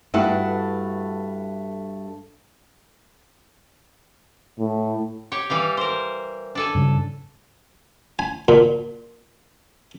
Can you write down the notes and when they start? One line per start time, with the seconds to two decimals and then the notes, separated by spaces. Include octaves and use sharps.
0.14 G2 A3 E4 F#4 A4 B4
4.59 A2
5.32 G4 C#5
5.50 E3 G3 F5
5.77 A#4 C5
6.55 D4 A4 G#5
6.75 G2 C#3
8.19 G#5
8.48 A#2